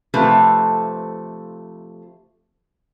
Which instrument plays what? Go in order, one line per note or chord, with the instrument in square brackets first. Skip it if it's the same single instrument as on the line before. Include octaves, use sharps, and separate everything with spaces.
[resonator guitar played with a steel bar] C3 F3 A3 A4 B4